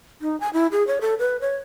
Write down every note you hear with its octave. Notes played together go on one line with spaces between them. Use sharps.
D#4
G#5
E4
G#4
C#5
A4
B4
C#5